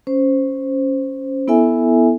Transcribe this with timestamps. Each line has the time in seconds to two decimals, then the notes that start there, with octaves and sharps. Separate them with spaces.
0.07 C#4 C5
1.48 B3 E4 A4 E5 G#5